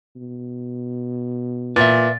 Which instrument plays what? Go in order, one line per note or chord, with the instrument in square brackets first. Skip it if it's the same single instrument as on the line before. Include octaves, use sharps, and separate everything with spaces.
[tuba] B2
[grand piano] A#2 [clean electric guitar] B4 E5 [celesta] A6